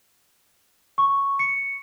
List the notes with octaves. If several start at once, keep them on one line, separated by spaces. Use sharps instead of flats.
C#6
C#7